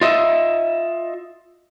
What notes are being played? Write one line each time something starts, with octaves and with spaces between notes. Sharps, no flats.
F4 D#5 E5